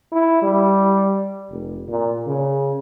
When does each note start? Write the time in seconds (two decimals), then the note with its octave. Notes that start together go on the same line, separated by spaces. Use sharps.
0.12 E4
0.42 G3
1.51 F1
1.89 A#2
2.26 C#3